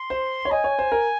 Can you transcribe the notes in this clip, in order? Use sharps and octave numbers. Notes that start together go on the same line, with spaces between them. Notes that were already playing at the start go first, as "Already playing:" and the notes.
Already playing: C6
C5
C#5
D#5 G#5
C#5
C5
A#4